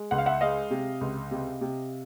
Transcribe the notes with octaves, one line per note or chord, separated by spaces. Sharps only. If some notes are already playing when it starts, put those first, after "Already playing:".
Already playing: G#3
C#2 F#5
F5
E5 F#5
G#3 D#5 F5
C3
C#2
C3
C3